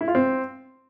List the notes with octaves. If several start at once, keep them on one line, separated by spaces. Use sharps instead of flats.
E4
F4
C4